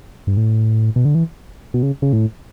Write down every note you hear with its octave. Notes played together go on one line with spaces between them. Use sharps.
G2
A2
B2
D3
E3
B2
C#3
C#3
A2